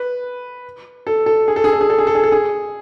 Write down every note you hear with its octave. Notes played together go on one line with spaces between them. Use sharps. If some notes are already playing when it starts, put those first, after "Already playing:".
Already playing: B4
A4
A4
G#4
A4
G#4
A4
G#4
A4
G#4
A4
G#4
A4
G#4